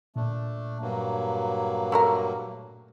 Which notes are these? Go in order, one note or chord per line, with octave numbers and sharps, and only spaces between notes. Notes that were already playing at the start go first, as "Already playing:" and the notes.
A#2 A3 D4
G2 F#3 A#3
A3 A4 A#4